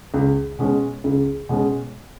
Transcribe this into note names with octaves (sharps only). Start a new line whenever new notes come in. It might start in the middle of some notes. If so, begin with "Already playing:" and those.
C#2
B2 G#3 C#4
C#2
B2 G#3 C#4